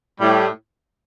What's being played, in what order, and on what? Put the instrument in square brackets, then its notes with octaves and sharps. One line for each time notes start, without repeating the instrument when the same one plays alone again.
[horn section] A2 G3